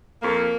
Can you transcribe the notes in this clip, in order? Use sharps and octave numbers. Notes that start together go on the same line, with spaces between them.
F2 A#3